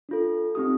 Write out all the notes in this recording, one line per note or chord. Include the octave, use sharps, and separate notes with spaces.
D4 F4 A4
C4 D#4 G4 D#6